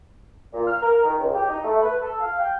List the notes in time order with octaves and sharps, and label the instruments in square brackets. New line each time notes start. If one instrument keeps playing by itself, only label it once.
[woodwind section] A#2
F6
A#4
D#3
C#2
G4
D#4
A3
B4
A4
F5
G5